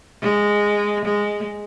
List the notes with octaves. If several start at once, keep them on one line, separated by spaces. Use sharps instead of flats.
G#3
G#3